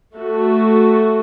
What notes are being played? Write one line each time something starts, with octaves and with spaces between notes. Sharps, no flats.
A3 F#4 A4